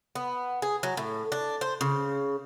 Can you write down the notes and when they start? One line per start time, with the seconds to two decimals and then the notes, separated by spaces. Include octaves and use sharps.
0.15 B3
0.62 G#4
0.83 F#3
0.97 A2
1.32 D4
1.61 C5
1.81 C#3